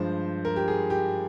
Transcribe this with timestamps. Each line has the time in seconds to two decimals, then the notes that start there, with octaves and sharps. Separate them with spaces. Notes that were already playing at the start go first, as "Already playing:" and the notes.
Already playing: G2 F3 G#3 C5
0.45 A#4
0.56 G4
0.68 G#4
0.90 G4